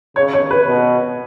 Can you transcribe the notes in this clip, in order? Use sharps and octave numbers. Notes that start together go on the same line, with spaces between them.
C#3 C#5
C#5
B4
B2